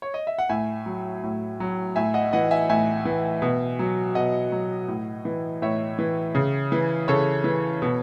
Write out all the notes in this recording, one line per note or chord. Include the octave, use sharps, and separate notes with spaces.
C#5
D#5
E5
F#5
A2 E5 G#5
F#3
A2
F#3
A2 E5 G#5
D#5 F#5
E3 D#5 F#5
E5 G#5
A2 E5 G#5
E3
B2
F#3
B2 D#5 F#5
F#3
A2
E3
A2 C#5 E5
E3
C#3
E3
C#3 A4 C#5
E3
B2